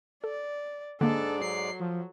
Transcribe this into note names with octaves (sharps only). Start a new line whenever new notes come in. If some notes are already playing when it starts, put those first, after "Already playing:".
A4 D5
G#2 D3 G#3 A#3 D4 A4 D5
F#3 C7
F3